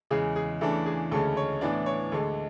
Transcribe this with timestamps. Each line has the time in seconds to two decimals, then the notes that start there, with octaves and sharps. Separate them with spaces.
0.11 E2 C#3 G#3 G#4
0.36 G#4
0.61 E2 C#3 E3 A3 D4 A4
0.86 G#4
1.11 D2 C#3 G#3 C#4 A4
1.37 C#5
1.61 A2 E3 B3 D4 D5
1.86 C#5
2.12 D2 D3 G#3 A4